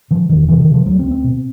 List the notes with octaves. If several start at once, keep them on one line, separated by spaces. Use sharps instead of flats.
D3 F3
E1 D#3
C3 E3
D#3
C3
F3
D2 F#3
C4
D2
C4
B2